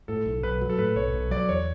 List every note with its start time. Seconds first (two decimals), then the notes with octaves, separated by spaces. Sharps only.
0.08 A2 A4
0.26 B1
0.43 B1 B4
0.61 F#3
0.69 A4
0.78 A2 B4
0.96 B1 C#5
1.14 B1
1.31 F#3 D5
1.48 E2 C#5